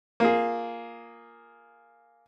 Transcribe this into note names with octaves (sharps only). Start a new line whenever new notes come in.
A#3 F4 G#4